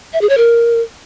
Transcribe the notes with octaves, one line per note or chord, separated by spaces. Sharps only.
E5
G#4
C#5
A#4